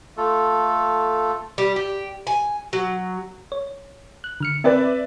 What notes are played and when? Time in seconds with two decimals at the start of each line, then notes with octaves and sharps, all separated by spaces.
0.17 A3 F4 A4
1.58 G3
1.76 G4
2.27 G#5
2.73 F#3
3.52 C#5
4.24 F#6
4.40 D3 F6 C#7
4.64 C4 B4 D5 E5